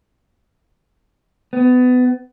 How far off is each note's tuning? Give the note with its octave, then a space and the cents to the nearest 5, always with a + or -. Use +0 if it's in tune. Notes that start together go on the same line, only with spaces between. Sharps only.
B3 +25